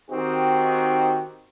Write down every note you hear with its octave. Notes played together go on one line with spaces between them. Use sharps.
D#3 C4 D#4 F#4 G4